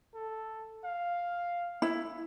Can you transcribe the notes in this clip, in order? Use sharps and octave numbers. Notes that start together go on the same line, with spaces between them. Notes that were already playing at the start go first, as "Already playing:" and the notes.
A4
F5
E4